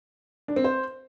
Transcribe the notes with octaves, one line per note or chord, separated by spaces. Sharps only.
D4
C4
C5